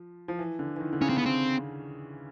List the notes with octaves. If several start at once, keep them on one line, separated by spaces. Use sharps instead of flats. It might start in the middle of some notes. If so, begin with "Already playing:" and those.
Already playing: F3
F3
E3
D3
E3
D#3
D3
C#3 C#4
C4
B3
C4